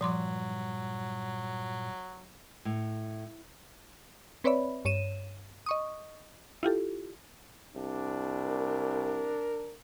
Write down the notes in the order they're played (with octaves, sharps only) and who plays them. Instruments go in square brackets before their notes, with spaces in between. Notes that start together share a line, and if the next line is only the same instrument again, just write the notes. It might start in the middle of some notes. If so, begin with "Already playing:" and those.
[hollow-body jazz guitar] G2 [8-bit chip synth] A#2 [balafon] F3 C6 D6 [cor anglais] F#3
[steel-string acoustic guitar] A2
[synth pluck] C4 B4 C#5 D5 E5 B5
G2 C#5 D#7 E7
D#5 C#6 D#6
E4 F4 G4 A4
[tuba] C2 [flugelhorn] D4
[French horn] A#4